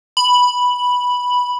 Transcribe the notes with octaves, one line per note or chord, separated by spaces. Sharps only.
B5